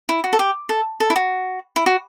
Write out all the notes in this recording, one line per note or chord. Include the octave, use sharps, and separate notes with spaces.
E4
F#4
A4
G4
A4
A4
E4
F#4
E4
F#4